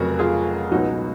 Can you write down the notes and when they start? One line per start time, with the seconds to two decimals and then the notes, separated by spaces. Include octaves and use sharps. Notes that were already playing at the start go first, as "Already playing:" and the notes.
Already playing: F1 F2 C#3 F#3 F#4 A#4
0.19 F4 G#4
0.71 C#2 B2 F#3 D#4 F#4